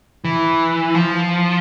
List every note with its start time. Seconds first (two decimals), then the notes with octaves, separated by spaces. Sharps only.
0.25 E3
0.95 F3